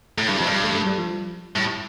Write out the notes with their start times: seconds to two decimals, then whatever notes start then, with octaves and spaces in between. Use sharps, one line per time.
0.18 A2 A3
0.27 G2 G3
0.37 F2 F3
0.47 G2
0.52 G3
0.64 A3
0.75 A3
0.87 G3
0.98 F3
1.56 A2 G3